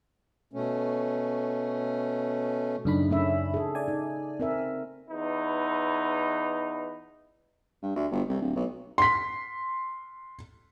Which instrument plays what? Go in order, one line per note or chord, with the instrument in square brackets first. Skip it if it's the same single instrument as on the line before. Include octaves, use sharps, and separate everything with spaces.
[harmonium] B2 A3 C#4
[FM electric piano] F#2 D4 B5 [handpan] C#3 A3 D#4
[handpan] A3 C#4 E5
G#4 A4
[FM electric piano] D5 G#5
[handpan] D#4
C4 A#4 E5
[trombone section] E2 D#4 B4
[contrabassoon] G2
D2
G1
C2
D1
B1
[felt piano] C6 B6